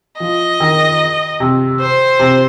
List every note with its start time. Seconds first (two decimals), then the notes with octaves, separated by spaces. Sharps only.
0.20 F3 D#5
0.60 D#3
1.40 C3
1.80 C5
2.19 C3